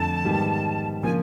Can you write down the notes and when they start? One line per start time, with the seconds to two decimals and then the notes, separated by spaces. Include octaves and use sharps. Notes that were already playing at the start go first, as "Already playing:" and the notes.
Already playing: F2 D3 F3 A3 A5
0.25 G#2 D#3 G3 B3
1.02 C#3 F3 A#3 D4 G#5